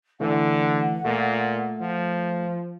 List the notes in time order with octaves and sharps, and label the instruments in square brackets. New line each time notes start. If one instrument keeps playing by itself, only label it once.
[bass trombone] D3 [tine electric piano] E3 A3 [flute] F#5
[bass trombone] A#2 [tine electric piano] A3
[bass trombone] F3